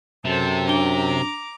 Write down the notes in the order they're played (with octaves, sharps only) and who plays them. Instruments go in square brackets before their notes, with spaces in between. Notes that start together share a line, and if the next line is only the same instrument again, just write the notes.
[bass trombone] F#2 [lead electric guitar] C3 [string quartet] A4 C5
[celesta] D4 G7 [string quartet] A#5 D6